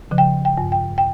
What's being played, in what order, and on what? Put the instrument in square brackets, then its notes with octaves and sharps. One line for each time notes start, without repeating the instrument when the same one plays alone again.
[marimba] C#3 F3
G5
G5
G2
G5
G5